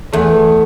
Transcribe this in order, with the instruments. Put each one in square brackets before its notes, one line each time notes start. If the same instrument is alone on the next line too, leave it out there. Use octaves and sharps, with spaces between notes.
[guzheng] E2 [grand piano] A3